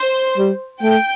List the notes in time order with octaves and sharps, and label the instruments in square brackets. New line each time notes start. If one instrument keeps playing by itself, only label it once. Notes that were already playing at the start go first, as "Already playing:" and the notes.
Already playing: [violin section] C5
[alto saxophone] G3
[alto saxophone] A3 [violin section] G5